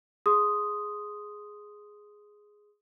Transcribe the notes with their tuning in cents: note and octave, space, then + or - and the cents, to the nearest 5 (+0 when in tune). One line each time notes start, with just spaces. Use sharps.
G#4 +5 C6 +0 D#6 +0